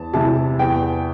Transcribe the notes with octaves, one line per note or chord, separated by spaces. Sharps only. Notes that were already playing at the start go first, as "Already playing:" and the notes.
Already playing: E2 A5
C3 E3 A5
E2 G5